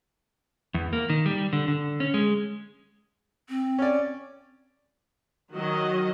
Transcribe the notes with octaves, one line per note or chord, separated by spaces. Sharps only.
E2
A#3
D#3
G3
D3
D3
C#4
G#3
C4
C#4 D5
D#3 F#3 F#4 D#5